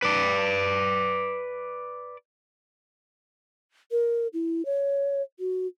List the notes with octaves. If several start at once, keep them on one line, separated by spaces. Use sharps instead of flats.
B4 D5
A#4
E4
C#5
F#4